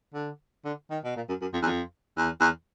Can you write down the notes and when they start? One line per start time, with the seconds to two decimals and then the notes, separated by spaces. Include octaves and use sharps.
0.14 D3
0.65 D3
0.90 D#3
1.04 B2
1.16 A#2
1.29 F#2
1.41 F#2
1.53 F2
1.62 E2
1.66 F2
2.17 E2
2.40 E2